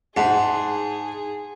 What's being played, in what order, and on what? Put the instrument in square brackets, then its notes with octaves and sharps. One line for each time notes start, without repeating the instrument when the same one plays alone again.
[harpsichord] G#2 [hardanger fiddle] G#4 [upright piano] F#5 [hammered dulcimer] A5 C6